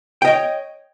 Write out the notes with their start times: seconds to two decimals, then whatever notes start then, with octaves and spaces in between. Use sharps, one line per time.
0.22 G5
0.25 D#5
0.27 C#5